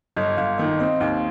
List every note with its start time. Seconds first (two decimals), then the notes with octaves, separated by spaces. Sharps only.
0.16 G1 D#5
0.37 G1 F5
0.58 D#3 D#5
0.79 C4 D#5
1.00 D#2 F5